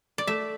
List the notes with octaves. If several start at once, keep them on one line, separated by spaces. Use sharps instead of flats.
D5
A3 E5